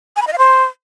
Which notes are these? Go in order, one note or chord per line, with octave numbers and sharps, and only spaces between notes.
G#5
B5
D#5
F5
C5